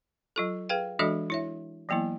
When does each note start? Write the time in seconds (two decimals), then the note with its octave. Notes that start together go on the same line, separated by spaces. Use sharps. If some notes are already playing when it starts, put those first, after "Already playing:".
0.36 F#3 F4 A4
0.69 G#4 B4 F5 G5
0.99 E3 G#3 D4 F#4 A4 D#5
1.30 E4 C#5 E5
1.89 E3 F#3 A#3 B3 E4